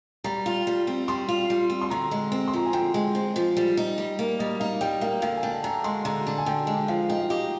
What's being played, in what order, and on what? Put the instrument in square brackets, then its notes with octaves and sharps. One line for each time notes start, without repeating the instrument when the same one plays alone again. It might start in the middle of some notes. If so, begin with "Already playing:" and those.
[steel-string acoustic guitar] G3 [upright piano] A#5
[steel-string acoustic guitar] F4
G3
C4
[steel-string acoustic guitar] G3 [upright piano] C6
[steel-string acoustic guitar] F4
G3
C4
[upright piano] C6
[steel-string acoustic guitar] D3 [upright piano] A#5
[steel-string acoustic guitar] G#3
C4
[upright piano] C6
[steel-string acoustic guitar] F3 [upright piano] A#5
[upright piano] G#5
[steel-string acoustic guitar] D3 [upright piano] G5
[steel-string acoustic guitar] G#3
C4
F3
G3
D#4
G3
A#3
[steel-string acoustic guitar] G3 [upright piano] D#5
[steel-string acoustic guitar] D#4 [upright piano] F5
[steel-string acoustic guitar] G3 [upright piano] G5
[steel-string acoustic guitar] A#3 [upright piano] F5
[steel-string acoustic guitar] D3 [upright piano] F5
[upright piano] G#5
[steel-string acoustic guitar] D4 [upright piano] G5
[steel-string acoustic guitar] D3 [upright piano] A#5
[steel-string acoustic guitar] G#3 [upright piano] C6
[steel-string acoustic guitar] D3 [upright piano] A#5
[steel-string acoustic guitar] D4
[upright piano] G#5
[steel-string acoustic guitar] D3 [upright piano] G5
[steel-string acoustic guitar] G#3
[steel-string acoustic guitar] F3 [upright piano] F5
[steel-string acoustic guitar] D#4 [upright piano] G5
[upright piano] F5
[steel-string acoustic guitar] G4 [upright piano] D#5